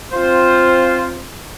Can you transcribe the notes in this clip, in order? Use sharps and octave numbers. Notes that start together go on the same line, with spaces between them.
C4 F4 C5